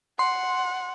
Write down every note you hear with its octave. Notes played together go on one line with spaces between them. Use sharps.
F#5 C6